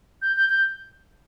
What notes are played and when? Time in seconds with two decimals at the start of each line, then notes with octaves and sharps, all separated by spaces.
0.22 G6
0.36 G6
0.49 G6